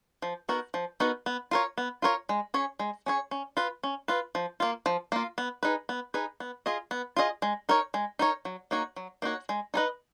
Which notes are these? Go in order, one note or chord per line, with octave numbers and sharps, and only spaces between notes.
F3
B3 D#4 F#4 A#4
F3
B3 D#4 F#4 A#4
B3
F4 A#4 C#5
B3
F4 A#4 C#5
G#3
C#4 G#4 C#5
G#3
C#4 G#4 C#5
C#4
F4 B4
C#4
F4 B4
F3
A#3 F4
F3
A#3 F4
B3
D#4 G#4 B4
B3
D#4 G#4 B4
B3
F4 G#4 D#5
B3
F4 G#4 D#5
G#3
D#4 A#4 C#5
G#3
D#4 A#4 C#5
F#3
A#3 D#4 F#4 C#5
F#3
A#3 D#4 F#4 C#5
G#3
D#4 G#4 B4 D#5